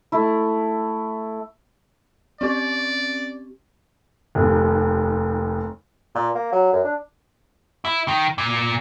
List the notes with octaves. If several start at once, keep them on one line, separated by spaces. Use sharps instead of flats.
A3 E4
C4 C#4 G4 D5
F1 D#2
A#2
A#3
F#3
F#2
D4
E4
D#3
A#2